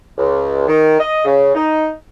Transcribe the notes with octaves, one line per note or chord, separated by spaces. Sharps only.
C#2
D#3
D#5
C#3
D#4